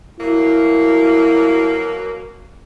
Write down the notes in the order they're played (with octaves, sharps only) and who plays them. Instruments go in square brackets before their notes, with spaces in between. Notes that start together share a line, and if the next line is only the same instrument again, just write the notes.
[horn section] B2 F#3 A#3 [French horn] E4